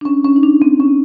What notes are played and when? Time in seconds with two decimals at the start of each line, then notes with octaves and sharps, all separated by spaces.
0.01 D4
0.05 C#4
0.24 C#4
0.36 D#4
0.43 D4
0.62 C4
0.80 C#4